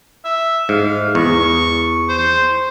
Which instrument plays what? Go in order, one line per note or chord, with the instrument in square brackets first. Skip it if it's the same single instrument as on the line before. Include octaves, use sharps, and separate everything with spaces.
[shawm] E5
[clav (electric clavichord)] G#2 [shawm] F5
[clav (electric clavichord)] E2 [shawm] C#6
[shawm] C5